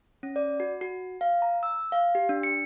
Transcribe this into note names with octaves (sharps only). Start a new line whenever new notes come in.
C#4
D5
F#4
F#4
F5
A#5
E6
F5
G4
D4
C#7